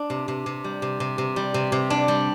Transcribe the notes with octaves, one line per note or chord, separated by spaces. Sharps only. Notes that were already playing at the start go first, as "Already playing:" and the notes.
Already playing: D4
C3
C3
C3
G3
C3
C3
C3
G3
C3
C3
D4
G3